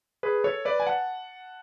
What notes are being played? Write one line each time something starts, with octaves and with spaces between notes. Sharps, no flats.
G#4 B4
A4 C#5
B4 D5
G#5
F#5 A5